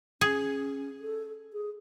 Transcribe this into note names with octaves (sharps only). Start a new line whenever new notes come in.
C#4 G#4
A4
G#4